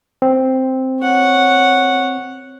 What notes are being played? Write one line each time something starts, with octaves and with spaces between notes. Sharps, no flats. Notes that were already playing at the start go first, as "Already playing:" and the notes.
C4
C#5 F#5